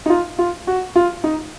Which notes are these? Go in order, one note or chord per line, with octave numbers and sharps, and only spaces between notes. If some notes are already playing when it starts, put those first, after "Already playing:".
D#4
F4
F4
F#4
F4
D#4